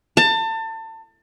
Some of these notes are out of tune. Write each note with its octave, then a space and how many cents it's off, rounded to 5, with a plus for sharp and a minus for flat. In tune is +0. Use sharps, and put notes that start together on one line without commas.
A5 +30